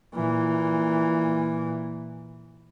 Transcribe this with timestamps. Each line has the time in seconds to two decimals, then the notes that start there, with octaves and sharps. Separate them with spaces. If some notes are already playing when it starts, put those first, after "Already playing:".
0.14 A#2 E3